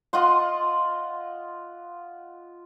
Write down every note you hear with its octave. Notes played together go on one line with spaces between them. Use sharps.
F4 D#5 F#5 C6